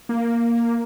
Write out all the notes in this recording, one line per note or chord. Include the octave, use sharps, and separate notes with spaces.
A#3